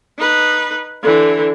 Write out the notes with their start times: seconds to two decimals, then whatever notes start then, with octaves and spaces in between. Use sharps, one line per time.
0.17 D#4 B4
1.03 D3 E3